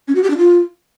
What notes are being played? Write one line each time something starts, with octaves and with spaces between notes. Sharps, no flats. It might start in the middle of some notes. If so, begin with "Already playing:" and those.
C#4
F#4
G4
D4
F4